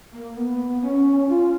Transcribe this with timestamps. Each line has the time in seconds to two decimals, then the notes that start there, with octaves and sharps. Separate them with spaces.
0.13 A#3
0.37 B3
0.83 C#4
1.29 F4